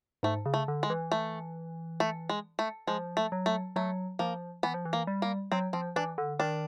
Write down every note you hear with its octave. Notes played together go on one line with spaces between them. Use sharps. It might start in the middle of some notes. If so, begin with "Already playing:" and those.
G#2 A3
C#3
A3
D3
G#3
E3
A3
A3
G#3
A3
F3 G#3
A3
F#3
A3
F#3 A3
F3 A#3
E3 B3
F3
E3
A#3
G3
A#3
F#3 C4
F3 C4
E3 D4
D3
D#3 D4